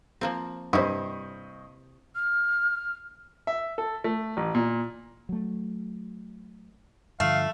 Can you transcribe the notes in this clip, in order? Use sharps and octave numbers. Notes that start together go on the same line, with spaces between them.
F3 A#3 C4
G2 C3 E4 C5 D#5 C#6 D#6
F6
E5
A4
A3
A1
A#2
F#3 A3
G2 D3 F3 A3 F5